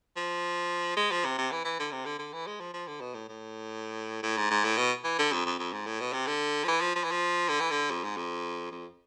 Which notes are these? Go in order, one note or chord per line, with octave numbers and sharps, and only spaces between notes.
F3
G#3
F3
C3
C3
E3
E3
D3
C3
D3
D3
E3
G#3
F3
F3
D3
B2
A2
A2
A2
G#2
G#2
A2
B2
E3
D3
F2
F2
F2
G#2
A2
B2
C3
D3
F3
E3
F3
F3
E3
F3
D3
E3
D3
F2
G#2
F2
F2